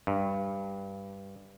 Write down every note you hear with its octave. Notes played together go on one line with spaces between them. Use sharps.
G2